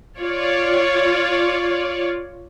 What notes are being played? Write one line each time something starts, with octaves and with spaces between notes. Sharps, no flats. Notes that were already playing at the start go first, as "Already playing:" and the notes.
F4 C#5 D5